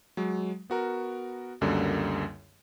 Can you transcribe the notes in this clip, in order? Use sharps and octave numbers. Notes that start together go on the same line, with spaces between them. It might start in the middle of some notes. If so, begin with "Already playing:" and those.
F#3 G#3
B3 F#4 A#4
C#2 F#2 D3 G3 A#3